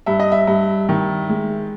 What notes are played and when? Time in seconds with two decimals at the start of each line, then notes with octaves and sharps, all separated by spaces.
0.06 G2 E5
0.20 D#5
0.32 E5
0.47 G2
0.89 D#3
1.29 G#3